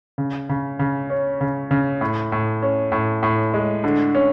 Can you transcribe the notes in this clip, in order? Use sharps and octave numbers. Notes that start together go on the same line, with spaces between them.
C#3
C#3
C#3
C#4
C#3
C#3
A2
A2
C#4
A2
A2
G#3
D3
C#4